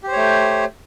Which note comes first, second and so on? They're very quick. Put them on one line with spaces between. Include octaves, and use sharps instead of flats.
G4 C5 C#5 A3